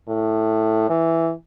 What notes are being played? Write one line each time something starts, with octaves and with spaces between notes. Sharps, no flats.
A2
E3